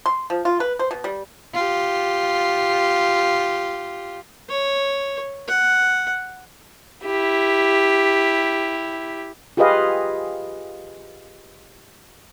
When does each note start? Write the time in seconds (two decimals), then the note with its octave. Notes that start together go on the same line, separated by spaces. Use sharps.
0.06 C6
0.30 F3
0.45 F4
0.60 B4
0.79 C5
0.91 B2
1.04 G3
1.54 F4 G4
4.49 C#5
5.48 F#5
7.04 E4 G4
9.57 F4 G4 G#4 B4 D#5 F5